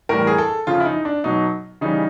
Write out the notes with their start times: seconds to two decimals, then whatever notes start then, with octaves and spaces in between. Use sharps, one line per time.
0.09 A2 E3 G3 A#4
0.27 G#4
0.38 A4
0.67 C#3 F3 F4
0.80 E4
0.86 D#4
1.05 D4
1.24 B2 F#3 D#4
1.81 C#3 E3 G3 D#4